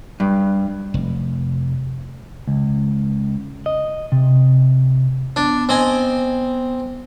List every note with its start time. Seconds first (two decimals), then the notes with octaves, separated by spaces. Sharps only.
0.20 G2
0.94 F1
2.47 C#2
3.66 D#5
4.12 C3
5.36 B3 D4
5.69 C4 D#5 G#5